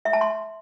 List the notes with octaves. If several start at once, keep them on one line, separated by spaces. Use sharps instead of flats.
E5
A5
C6